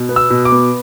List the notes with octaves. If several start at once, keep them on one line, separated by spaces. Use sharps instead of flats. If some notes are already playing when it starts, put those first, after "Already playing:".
Already playing: B2
B3
E6
B2
D6
B3